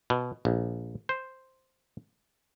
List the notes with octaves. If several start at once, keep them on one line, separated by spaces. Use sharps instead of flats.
B2
A#1
C5